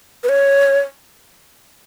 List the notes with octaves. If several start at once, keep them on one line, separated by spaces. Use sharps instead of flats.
B4
C#5